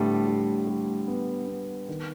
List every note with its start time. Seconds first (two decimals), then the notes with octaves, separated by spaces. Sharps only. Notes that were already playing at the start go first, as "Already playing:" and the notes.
Already playing: A2 D3 G3 B3
0.27 G3
0.67 G3
1.08 B3
1.48 B3
1.89 D#3